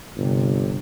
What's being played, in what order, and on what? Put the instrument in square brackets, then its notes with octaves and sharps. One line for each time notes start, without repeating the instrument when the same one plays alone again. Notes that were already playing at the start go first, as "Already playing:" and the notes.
[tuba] G1 [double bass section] C3